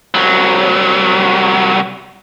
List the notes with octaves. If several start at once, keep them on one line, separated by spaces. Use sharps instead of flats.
C2 F#3